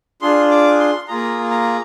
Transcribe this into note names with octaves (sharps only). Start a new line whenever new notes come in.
D4 F4 G#4 C6
D6
C6
A#3 F4 G#4 A#5
A#5